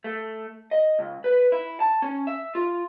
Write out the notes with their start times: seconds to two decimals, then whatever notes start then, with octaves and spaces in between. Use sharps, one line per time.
0.04 A3
0.71 D#5
0.99 C#2
1.24 B4
1.52 E4
1.80 A5
2.02 C#4
2.27 E5
2.55 F4